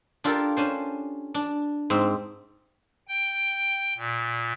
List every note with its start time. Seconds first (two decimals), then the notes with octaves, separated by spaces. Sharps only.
0.24 D4 F4 G4 A4 A#4
0.57 C#4 D4 C5
1.34 D4
1.90 G#2 C4
3.08 G5
3.98 A#2